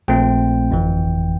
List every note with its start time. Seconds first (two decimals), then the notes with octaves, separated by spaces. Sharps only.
0.08 A#1 A#2 A3 C4 G5
0.71 G1 F2 E3